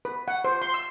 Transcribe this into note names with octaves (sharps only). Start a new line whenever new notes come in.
B4
F#5
C5
C6
E6